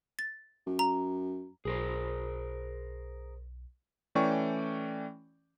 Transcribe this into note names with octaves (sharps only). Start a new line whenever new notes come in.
A6
F#2
A#5
B1 G#4 A#4 C5
E3 A3 C#4 D5 G5 C#6